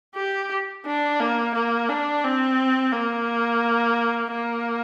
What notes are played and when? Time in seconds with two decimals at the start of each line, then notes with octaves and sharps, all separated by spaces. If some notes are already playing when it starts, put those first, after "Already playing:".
0.16 G4
0.86 D4
1.20 A#3
1.55 A#3
1.88 D4
2.24 C4
2.93 A#3
4.31 A#3